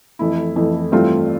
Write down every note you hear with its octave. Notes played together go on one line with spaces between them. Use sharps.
F2 E3 A3 E4
F2 E3 A3
G2 E3 A3 C4 F4